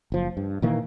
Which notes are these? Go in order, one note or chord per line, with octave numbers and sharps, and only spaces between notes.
F#1 F3
G2
A#2 D#3 E3 A#3